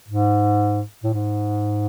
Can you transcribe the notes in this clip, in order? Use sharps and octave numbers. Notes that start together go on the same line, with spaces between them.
G#2
A2
G#2